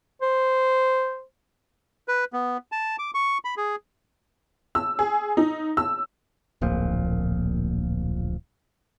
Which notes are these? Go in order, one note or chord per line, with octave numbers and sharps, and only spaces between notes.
C5
B4
B3
A5
D6
C#6
B5
G#4
E6
G#4
D#4
E6
D1 A#1 A#2 F3